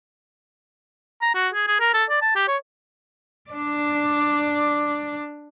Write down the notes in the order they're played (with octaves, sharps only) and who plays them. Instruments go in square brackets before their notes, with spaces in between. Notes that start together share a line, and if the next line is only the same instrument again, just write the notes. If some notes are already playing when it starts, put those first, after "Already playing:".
[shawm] A#5
F#4
G#4
G#4
A#4
A4
D5
A5
G4
C#5
[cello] D4 D5